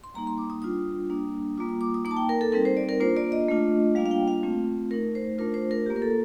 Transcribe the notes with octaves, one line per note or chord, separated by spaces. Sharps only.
C6
G3 A#3 D#4 A#5
C6
D6
D#6
G3 D4 F4 D#6
G3 A#3 D4
G3 A#3 F4 D6
D#6
D6
D#6
A#3 D#4 D6
A5
G5
A#4
A4
G3 C4 D#4 A#4
C5
D5
A#4
A#3 D4 F4 C5
D5
D#5
A3 D4 F4
G3 A#3 D4 F4 F5
F5
G5
F5
A3 C4 F4
A3 D#4 A#4
C5
A3 D4 F4 A#4
C5
A#4
A#3 F4 G4
A#4
A4